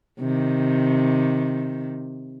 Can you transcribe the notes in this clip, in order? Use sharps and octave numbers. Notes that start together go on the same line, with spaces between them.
C3 D#3